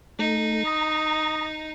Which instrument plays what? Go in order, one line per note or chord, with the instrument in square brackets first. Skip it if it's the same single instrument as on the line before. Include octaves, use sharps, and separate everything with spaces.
[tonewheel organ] A3 [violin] D#4
[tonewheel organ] A#5 [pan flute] D#6